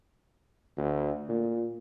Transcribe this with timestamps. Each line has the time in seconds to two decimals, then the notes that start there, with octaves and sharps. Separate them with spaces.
0.77 D2
1.29 A#2